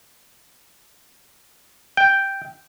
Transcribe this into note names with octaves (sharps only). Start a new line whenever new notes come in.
G5